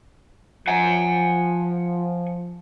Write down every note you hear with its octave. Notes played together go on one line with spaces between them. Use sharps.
F3 F#5 G#5